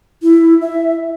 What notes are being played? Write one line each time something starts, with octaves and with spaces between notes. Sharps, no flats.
E4
E5